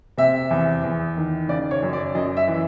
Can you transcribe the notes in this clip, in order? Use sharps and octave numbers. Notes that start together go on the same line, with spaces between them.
C3 E5
E2
E2
D#3
C#3 D5
C#5
F#2
D5
F#2 D#5
E5
E3